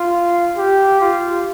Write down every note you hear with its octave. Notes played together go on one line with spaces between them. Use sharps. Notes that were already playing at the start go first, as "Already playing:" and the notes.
Already playing: F4
G4
F4